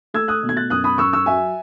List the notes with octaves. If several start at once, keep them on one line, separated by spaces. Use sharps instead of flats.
A3 E6 G#6
D#6 F#6
B2
G#6
F#6 A6
F#2 D#6 F#6
B5 D#6
F#2 C#6 E6
C#6 E6
F#3 E5 G#5